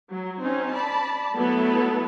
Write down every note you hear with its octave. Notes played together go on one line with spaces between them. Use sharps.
F#3
C4 C#4 D#4
D5 A5 B5
F#3 A3 B3 E4 A4 B4